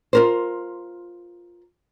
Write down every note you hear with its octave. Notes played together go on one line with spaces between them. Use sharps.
F4 A#4 C5